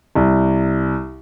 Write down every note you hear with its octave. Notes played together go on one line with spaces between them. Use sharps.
C2